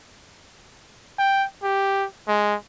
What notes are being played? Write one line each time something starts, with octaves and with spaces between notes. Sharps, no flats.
G5
G4
G#3